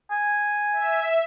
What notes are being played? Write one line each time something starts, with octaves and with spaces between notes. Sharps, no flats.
G#5
E5